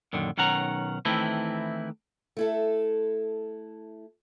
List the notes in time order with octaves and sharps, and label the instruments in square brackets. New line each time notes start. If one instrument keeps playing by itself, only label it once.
[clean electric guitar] F#2 A#2 D3 D#3
B1 D#3 C#4 F#5 A#5
D#3 E3 A3 C4 E4
[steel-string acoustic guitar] A3 E4 A4